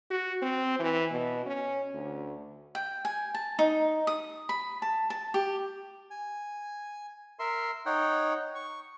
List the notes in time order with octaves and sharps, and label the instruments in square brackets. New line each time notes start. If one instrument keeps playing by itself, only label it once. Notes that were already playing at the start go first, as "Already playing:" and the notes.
[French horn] F#4
C4
E3
B2
C#4
D2
[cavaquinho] G5
G#5
A5
D#4
D#6
B5
A5
A5
G4
[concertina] G#5
A#4 E5 C6
D#4 C#5 F#5 G5
C#6